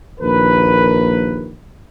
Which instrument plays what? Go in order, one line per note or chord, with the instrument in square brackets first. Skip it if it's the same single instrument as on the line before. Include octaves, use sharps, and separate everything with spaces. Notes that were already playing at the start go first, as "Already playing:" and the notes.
[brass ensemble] A#1 D#2 A#4 B4